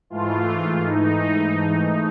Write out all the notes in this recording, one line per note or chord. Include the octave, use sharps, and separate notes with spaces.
G#2 E3 A3 F4
D#4